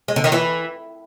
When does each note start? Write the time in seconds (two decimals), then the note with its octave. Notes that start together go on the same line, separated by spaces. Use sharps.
0.08 G#3
0.16 D3
0.24 D#3
0.32 E3